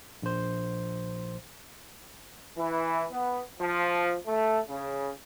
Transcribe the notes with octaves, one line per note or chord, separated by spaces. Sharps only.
A#1 C5
E3
B3
F3
A3
C#3